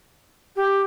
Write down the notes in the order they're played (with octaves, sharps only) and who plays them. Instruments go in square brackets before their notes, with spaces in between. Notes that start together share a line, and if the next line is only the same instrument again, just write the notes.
[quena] G4